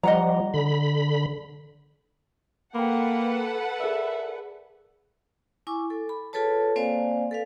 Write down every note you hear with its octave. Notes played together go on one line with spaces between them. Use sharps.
F3 G3 D#5 F#5 A#5
D3 B5
A#3 A4 B4 F#5 G5 B5
G#4 A#4 D5 E5
E4 G#5 C#6 D6
A4
B5
F4 G#4 A4 B4 C#5 A5
A#3 C4 C5 D5 F5 G#5
A4 B4 F5